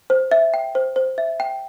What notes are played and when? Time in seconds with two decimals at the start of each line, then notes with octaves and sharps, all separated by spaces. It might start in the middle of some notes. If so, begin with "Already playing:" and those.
0.10 C5
0.31 E5
0.54 G5
0.75 C5
0.96 C5
1.18 E5
1.40 G5